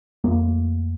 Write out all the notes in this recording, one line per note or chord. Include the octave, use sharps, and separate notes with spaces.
F2 A3 A#3